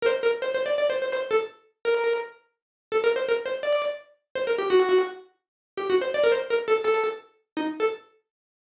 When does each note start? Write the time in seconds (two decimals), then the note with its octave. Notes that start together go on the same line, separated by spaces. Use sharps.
0.02 A#4
0.06 C5
0.24 A#4
0.42 C5
0.54 C5
0.66 D5
0.78 D5
0.90 C5
1.01 C5
1.13 C5
1.31 A4
1.85 A#4
2.92 A4
3.04 A#4
3.16 C5
3.27 A#4
3.46 C5
3.63 D5
4.35 C5
4.47 A#4
4.58 G4
4.70 F#4
5.77 G4
5.90 F#4
6.01 C5
6.14 D5
6.24 A#4
6.32 C5
6.50 A#4
6.68 A4
6.85 A4
7.57 D#4
7.80 A4